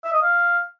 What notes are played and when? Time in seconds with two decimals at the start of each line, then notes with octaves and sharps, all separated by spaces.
0.04 E5
0.13 D#5
0.22 F5